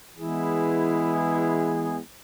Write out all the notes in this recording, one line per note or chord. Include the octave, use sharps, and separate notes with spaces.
E3 G#3 B3 E4 G#4